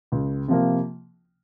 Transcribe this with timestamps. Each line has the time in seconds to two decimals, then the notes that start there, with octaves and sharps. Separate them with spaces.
0.12 C#2
0.48 C3 F3 A#3